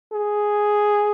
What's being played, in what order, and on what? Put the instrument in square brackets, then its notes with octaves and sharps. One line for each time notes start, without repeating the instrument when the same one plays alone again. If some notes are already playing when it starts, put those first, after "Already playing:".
[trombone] G#4